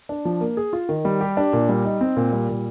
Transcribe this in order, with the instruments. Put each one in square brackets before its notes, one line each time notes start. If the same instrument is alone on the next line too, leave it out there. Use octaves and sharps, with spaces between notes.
[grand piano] D4
F3
A#3
G#4
F4
D#3
G3
G4
D4
A#2
G3
D#4
C4
A#2
G3
A#2